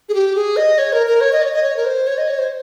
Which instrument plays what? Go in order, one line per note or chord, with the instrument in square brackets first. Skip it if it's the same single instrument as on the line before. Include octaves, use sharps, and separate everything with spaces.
[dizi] G#4
G4
G#4
D#5
C#5
A#4
A#4
C#5
D#5
C#5
D#5
C#5
A#4
C5
C#5
D#5
C#5
C5